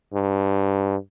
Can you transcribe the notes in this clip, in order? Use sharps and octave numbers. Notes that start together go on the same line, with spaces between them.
G2